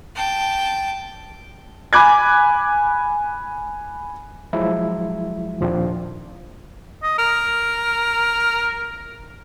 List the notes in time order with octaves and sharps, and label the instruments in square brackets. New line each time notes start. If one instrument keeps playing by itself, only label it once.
[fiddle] G5 A5
[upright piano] G#5 B5 D6 F#6 G#6
[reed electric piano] F3 F#3 G#3 E4
D#2 A#2 F3 C4 D4
[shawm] D#5
A#4